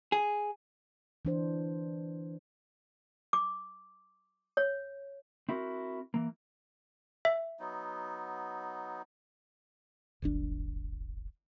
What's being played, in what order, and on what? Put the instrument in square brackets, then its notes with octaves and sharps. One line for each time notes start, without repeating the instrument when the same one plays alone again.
[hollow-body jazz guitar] G#4
[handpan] E3 D4 C5
[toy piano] D6
C#5
[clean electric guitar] C4 E4 F#4 A#4
E3 A#3
[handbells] E5
[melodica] F#3 B3 D#4
[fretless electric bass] D1 G1 D4